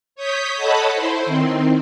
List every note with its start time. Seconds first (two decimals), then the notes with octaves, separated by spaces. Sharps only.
0.16 C#5 D#6 G6 B6
0.56 A4 C#5 D#5 F#5 A5 B5
0.94 E4 C5
1.26 D#3 C4